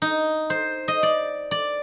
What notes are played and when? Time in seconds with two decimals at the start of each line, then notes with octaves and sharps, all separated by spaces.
0.02 D#4
0.50 C5
0.88 D#5
1.03 D5
1.51 D5